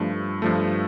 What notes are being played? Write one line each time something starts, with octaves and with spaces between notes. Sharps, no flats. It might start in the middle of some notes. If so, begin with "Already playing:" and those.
Already playing: G2 F3 A3
G2 F3 A3